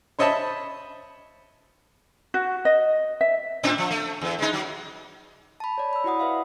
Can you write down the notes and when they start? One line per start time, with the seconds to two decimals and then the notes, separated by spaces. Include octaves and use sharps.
0.19 C5 C#5 D#5 E5 A5 B5
2.34 F#4
2.65 D#5
3.21 E5
3.63 A2 C4 D4
3.78 F3
3.91 A3
4.21 E2
4.39 G#3 D#4
4.53 F#3
5.60 A5 B5
5.78 C#5 D5
5.93 B5 E6
6.04 E4 F#4 D5 F#5 D#6
6.20 B4 E5 F5